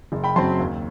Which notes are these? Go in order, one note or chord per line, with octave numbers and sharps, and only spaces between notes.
F#1
G5 B5
F#2 F#3 C4 A5 C6
D#2